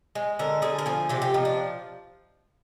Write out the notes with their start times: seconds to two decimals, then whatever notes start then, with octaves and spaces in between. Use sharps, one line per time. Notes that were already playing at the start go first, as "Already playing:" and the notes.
0.15 G#3
0.39 D3 A#4
0.62 D3 G#4
0.79 A#4
0.86 F3 G#4
1.09 C3 G4
1.22 G4
1.34 F3 D#4
1.45 D4